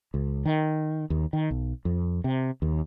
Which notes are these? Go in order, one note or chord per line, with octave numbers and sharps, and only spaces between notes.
C#2
D#3
D#2
D#3
B1
F2
C3
D#2